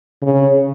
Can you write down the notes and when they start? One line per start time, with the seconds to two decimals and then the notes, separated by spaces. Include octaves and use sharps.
0.22 C#3